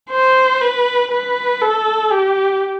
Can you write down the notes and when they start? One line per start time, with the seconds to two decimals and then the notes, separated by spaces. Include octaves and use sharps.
0.11 C5
0.62 B4
1.12 B4
1.61 A4
2.12 G4